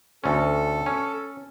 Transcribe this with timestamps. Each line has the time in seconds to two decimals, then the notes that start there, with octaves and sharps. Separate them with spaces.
0.24 D2 C#4 A4
0.86 C#4